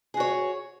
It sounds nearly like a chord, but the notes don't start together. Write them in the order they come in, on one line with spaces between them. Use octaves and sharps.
G#4 F#4 C#5